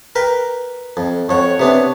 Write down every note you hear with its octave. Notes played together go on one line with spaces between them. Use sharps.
A#4 B4 G5
F2
F2 C#5 F#5
C3 B3 D4